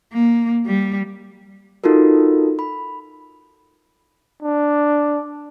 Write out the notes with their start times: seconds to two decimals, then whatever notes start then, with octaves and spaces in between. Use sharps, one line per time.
0.13 A#3
0.66 G3
1.84 D#4 F4 F#4 A4 A#4
2.59 B5
4.43 D4